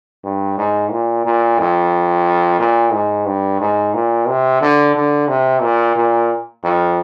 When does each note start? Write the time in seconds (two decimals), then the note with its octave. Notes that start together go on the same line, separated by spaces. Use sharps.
0.24 G2
0.58 G#2
0.92 A#2
1.25 A#2
1.59 F2
2.60 A#2
2.93 G#2
3.27 G2
3.61 G#2
3.94 A#2
4.28 C3
4.61 D3
4.95 D3
5.29 C3
5.62 A#2
5.96 A#2
6.64 F2